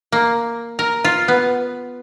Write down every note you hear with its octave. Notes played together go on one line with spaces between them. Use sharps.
A#3
A#4
F4
B3